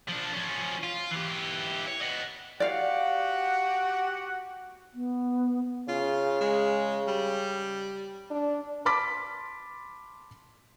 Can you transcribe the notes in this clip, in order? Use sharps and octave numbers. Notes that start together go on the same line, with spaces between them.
F3 D4
F3 C#4
F4
E3 G4
C#5
D#5 F#5
F#4 G4 D5 F5 F#5
B3
C#3 F4
G#3
G3
D4
A5 B5 C6 D6 A6 B6